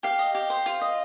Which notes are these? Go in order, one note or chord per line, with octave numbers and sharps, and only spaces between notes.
G4 F5
D#5
G4
C5
F4
D#5